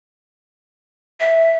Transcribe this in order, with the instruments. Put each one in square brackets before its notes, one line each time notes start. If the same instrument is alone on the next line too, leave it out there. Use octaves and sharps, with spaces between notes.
[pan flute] E5